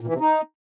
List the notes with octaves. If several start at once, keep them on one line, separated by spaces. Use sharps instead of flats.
A#2
E3
C3
D#4